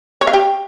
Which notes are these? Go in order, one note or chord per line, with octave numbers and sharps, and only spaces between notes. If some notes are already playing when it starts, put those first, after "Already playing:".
C#5
F5
G4